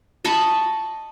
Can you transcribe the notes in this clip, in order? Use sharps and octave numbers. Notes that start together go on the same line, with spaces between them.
D#5 A5 B5 C#6